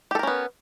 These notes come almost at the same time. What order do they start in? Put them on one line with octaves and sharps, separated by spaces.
G4 A4 A#4 C#4 B3